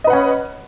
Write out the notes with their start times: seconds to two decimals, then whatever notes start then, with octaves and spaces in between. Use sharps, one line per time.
0.04 D#5
0.07 B4
0.10 F#5
0.13 C#4